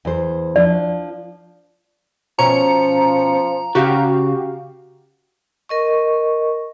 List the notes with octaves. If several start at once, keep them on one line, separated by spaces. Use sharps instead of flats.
E2 C5
F3 D4 D5
B2 F3 C#4 A#5 C#7
C#3 F#4 G4 F5
A#4 D#5 C#6